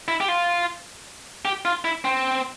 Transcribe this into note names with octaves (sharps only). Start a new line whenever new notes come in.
E4
G4
F4
G4
F4
E4
C4